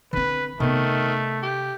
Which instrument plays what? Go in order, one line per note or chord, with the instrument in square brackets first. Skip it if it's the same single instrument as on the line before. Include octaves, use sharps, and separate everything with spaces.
[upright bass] D3 C4 [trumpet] B4
[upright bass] C3 B3 [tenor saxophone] D#3 [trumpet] A3
[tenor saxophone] G4